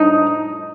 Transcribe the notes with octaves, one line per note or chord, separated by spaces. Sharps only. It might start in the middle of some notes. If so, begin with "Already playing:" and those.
Already playing: D#4